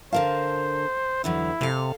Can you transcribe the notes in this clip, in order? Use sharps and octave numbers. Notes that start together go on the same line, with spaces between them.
D3 A#4 C5 F5 A5
E2 D3 F#3 E4
C3 A4 F5